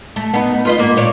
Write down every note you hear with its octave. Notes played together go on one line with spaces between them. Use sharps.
A3
B3 D#4
F4 B4 D#5
G#2 A#3
A#2 C#5 D5